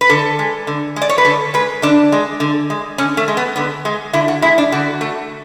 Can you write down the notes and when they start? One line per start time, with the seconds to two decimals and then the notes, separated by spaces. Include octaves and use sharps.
0.01 B4
0.09 D3 A4
0.39 G#3
0.67 D3
0.96 G#3
1.02 D5
1.09 C#5
1.18 B4
1.25 D3 A4
1.54 G#3 B4
1.82 D3 D4
2.12 G#3
2.40 D3
2.70 G#3
2.98 D3 C#4
3.17 A3
3.28 G#3
3.37 B3
3.56 D3 B3
3.85 G#3
4.13 D3 E4
4.28 F#4
4.42 G#3 E4
4.58 D4
4.72 D3 F#4
5.01 A3